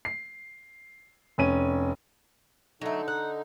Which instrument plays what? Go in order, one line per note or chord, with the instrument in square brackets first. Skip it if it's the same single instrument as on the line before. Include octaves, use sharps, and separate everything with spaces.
[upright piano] C7
F1 C#4 D#7
[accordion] D3 D#4 [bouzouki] F#3 A3
[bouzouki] F#5